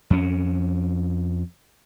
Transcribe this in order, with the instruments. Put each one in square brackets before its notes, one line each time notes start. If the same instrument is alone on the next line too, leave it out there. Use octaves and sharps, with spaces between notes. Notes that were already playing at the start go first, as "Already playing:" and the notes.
[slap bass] F2 C#4